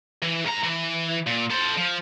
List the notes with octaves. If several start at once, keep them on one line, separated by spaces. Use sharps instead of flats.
E3
G#2 A#5
E3
A#2
A4 C5
F3